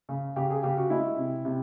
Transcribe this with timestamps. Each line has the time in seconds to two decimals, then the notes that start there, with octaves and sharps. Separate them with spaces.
0.09 C#3
0.36 C#3 G4
0.50 G#4
0.63 C#3 G4
0.77 F#4
0.90 G#3 E4
1.18 C3
1.45 C3